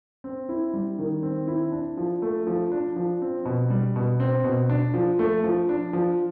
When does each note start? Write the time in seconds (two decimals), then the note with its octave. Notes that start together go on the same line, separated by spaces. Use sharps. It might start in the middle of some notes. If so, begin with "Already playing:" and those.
0.24 C4
0.49 E4
0.74 G3
0.99 D#3
1.23 C4
1.47 E4
1.72 D4
1.97 F3
2.22 A3
2.47 F3
2.72 D4
2.96 F3
3.22 C4
3.45 B2
3.70 G3
3.96 B2
4.20 C4
4.44 B2
4.70 D4
4.94 F3
5.19 A3
5.44 F3
5.69 D4
5.93 F3